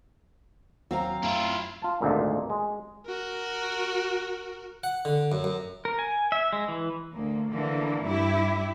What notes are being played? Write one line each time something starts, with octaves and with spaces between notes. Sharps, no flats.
D#2 F#3 A#3 C4 F5 A#5
F#2 A3 E4 F4
F4 A5
G#1 D2 A#2
G#3
F#4 A#4
F#5
D3
F#2
F#2
A#4
G#5
E5
G#3
E3
D2 A#3
D3 E3 A#3
G2 E4 G4